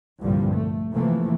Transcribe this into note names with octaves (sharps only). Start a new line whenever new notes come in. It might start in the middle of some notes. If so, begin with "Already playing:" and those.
C2 G2 A#2 D3 F3 G3
A3
C3 E3 F3 A3 A#3